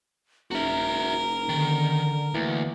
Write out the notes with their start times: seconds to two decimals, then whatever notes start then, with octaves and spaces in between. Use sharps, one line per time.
0.51 F#1 D#4 F#4 A#4 E5
1.49 D3 D#3
2.34 D2 E3 A#3